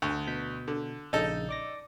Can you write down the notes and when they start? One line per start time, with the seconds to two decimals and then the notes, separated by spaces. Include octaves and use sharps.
0.02 D2
0.27 B2 G6 B6
0.68 D3
1.13 A#1 C#3 D#4 A4 G6
1.49 D5 D6 A#6